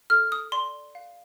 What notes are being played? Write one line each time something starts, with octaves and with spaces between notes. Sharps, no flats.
A4 F6
D#6
D5 C6
F5